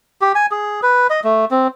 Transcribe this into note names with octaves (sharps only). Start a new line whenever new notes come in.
G4
G#5
G#4
B4
D#5
A3
C4